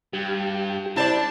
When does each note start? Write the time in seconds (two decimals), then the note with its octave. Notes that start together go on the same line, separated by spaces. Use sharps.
0.13 G2 G4
0.96 D4 E4 C5 D5 A5